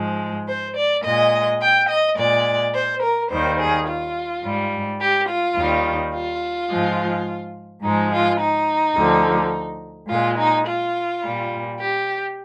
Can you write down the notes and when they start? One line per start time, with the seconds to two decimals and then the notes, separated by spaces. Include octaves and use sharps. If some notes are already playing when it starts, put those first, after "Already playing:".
Already playing: G#2 F3 G#3
0.48 C5
0.76 D5
1.04 A#2 G#3 D#5
1.61 G5
1.89 D#5
2.17 A#2 G#3 D5
2.74 C5
3.02 A#4
3.31 D#2 D#3 G3 C5
3.58 G#4
3.86 F4
4.44 G#2 G3
5.00 G4
5.28 F4
5.56 D#2 D#3 G3
6.13 F4
6.70 G#2 F3 G#3
7.83 G#2 F3 G#3 D#4
8.11 F4
8.39 D#4
8.96 D2 D3 F3
10.09 A#2 G#3 F4
10.37 D#4
10.65 F4
11.23 A#2 G3
11.79 G4